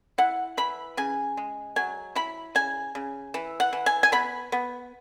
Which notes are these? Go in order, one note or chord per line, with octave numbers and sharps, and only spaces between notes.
E4 F#5
E3 B5
C#3 G#5
G#3
F#3 G#5
E4 B5
C#3 G#5
C#3
E3
F#5
E3
G#5
G#5
B3 B5
B3